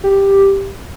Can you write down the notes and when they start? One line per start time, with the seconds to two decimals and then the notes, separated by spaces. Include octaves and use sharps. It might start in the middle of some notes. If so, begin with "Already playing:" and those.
0.04 G4